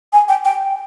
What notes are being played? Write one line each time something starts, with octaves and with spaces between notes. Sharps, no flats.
G#5
G5
G5